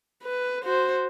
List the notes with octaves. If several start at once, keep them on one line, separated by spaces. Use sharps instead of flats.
B4
F#4 C5